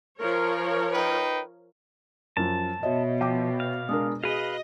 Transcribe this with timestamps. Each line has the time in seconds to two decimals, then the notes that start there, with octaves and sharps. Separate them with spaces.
0.18 F3 A#4 C#5
0.94 D#4 B4 G5
2.37 F#2 F3 A5
2.83 B2 F#4 C#5 D#5 E5
3.21 F3 G5 D6
3.60 F5
3.89 G#3 D4 A#4 D#6
4.23 F#4 G#4 B4 D#5 F5